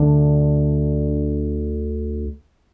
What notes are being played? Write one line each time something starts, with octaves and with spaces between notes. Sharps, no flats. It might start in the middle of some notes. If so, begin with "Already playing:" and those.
Already playing: D2 D3 D4